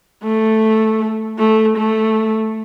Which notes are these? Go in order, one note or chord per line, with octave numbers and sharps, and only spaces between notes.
A3
A3
A3